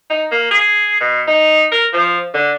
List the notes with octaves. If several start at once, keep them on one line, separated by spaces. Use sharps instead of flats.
D#4
A#3
G#4
B2
D#4
A#4
F3
D3